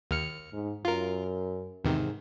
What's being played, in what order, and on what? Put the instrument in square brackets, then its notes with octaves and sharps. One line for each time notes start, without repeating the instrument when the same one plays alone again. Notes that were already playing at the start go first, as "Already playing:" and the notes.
[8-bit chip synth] D#2 F6 C#7
[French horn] G#2
[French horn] F#2 [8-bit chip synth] F4 A#4
[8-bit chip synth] E2 C3 D#3 [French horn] G#2